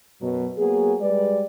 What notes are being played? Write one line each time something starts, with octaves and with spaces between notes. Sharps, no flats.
F#2 B2 F#3
F#3 A#3 B3 G#4
G3 G#3 G4 B4 D5